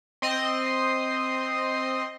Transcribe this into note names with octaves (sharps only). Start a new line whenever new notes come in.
C4 D#5 C6